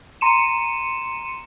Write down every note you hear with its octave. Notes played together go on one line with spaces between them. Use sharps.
A#5 C6 C#7 D#7 E7